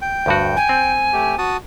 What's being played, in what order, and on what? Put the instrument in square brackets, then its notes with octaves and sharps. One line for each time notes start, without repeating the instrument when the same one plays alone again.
[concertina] G5
[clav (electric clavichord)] D2 G2 F#4
[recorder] G#5
[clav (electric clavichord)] C4
[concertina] A3 G4
F#4 A5 D#6